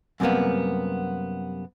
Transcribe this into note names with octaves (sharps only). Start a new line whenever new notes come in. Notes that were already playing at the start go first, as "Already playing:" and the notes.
F#2 C3 G3 A#3 B3